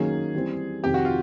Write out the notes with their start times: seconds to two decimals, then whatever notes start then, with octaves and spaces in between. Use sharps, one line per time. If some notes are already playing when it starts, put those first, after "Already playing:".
Already playing: D#3 F#3 A#3 C#4 G#4
0.35 E3 G3 C4
0.84 F2 C3 D#3 G4
0.94 F#4
1.05 F4